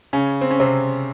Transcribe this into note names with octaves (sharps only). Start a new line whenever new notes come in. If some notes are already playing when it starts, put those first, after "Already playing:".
C#3 C#4
C4
C#4
C3 C4